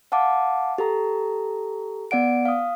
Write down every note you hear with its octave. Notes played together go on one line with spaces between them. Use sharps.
F5 F#5 A5 D6
G4 A4 A#5
B3 D5 F#5 D7
F5 D#6